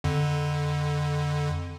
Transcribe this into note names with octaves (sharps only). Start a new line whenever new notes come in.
F2 D3